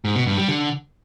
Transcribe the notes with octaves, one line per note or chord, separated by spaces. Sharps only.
G#2
B2
G2
G3
D3